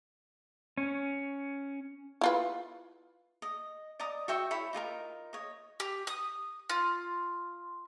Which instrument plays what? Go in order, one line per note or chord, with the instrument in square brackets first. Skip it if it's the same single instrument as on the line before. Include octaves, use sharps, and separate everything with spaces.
[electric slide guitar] C#4
[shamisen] E4 F4 B4
[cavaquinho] D#5
D5 D#5 A#5 D#6
F#4 E5 G5 C#6
E4 C#5 B5
D#4 F4 G#4 A#4
C#5 D#5
[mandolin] G4
D#6
F4